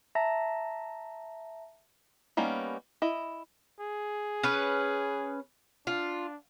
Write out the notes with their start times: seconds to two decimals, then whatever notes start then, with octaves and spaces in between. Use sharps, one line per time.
0.15 E5 A5 A#5 A#6
2.37 G3 A#3 B3 C#4 D#4
3.02 E4 D#5
3.80 G#4
4.43 C#4 B4
5.87 D4 F4